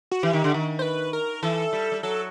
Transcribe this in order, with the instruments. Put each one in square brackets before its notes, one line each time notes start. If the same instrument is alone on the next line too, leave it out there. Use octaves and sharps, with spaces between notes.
[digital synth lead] F#4
[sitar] E3 [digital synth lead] G4
[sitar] D#3
D3
D#3
[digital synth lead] C5
B4
A#4
[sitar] E3 [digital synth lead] A4
[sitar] G3
G3
[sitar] F#3 [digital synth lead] A4